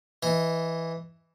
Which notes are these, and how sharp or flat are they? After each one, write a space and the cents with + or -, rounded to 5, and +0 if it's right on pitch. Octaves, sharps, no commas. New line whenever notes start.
E3 +0 D#5 +15